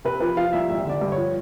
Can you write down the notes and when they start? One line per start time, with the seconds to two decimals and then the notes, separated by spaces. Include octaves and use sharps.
0.05 C3 B4
0.21 F3 B4
0.37 F3 F5
0.53 C2 E5
0.69 G#1 E5
0.85 D3 D5
1.01 G2
1.12 C#5
1.17 F3